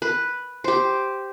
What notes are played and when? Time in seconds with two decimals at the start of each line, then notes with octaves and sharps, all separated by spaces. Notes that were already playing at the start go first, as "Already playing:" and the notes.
0.02 B4
0.64 G4 C5